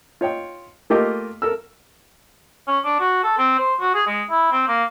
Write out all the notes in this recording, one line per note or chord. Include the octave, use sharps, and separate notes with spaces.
F4 C#5 D#5 G5
A3 A#3 F4 G4 A#4 D#5
A4 A#4 E6
C#4
D4
F#4
A4
C4
C5
F#4
G#4
G#3
E4
C4
A#3